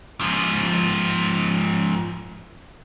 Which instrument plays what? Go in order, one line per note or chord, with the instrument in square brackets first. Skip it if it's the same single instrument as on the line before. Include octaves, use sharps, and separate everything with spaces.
[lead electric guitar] G#2 F3